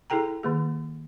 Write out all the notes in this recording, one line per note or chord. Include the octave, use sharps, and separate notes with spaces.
E4 G#4 A4 G5 A#5
D#3 A#3 G#4